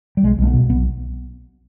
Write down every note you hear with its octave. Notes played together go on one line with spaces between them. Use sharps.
G3
B1 G#3
B1 G#3
B3
B2
B1 B3